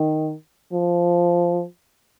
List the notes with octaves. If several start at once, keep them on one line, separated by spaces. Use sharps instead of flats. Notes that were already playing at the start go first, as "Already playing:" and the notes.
Already playing: D#3
F3